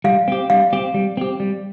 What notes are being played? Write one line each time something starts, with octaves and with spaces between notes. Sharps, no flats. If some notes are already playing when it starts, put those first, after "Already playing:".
G3 F5
C4 G4
G3 F5
C4 G4
G3
C4 G4
G3